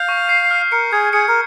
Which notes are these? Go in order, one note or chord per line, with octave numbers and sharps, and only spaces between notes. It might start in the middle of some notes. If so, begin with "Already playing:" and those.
Already playing: F5 G6
C#6
C7
F6
A#4 C#7
G#4 G#6
G#4 C#7
A#4